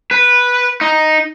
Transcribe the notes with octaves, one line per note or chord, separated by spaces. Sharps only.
B4
D#4